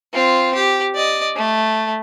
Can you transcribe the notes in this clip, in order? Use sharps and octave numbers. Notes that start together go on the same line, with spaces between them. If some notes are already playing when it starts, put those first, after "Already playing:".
C4 F4
G4
D5 D#5
A3